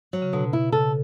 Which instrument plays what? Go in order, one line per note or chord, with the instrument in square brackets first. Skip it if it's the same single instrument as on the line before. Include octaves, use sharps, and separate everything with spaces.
[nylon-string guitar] F#3
[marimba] C#3
[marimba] B2 [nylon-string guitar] D3
[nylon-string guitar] E4
[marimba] C#3 [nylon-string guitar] A4